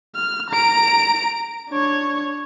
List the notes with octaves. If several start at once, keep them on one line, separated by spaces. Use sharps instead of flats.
F6
A#5 D7
D4 C#5